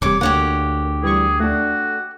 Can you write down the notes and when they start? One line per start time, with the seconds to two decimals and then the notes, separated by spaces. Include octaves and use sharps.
0.02 E1 C3 G3 C#5 D6
0.21 D2 D3 A#3 G4 C#5 F#5
1.03 E3 G3 G#4 C#6
1.40 A3 D4 F#4